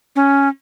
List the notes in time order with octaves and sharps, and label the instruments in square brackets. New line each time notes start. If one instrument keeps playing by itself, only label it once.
[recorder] C#4